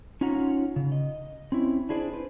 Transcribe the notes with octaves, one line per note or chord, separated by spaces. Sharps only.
C#4 D#4 F4 C#5 F#5 A#5
C#3
D#5
C4 C#4 E4
D4 E4 G#4 C5 D5
B4 C5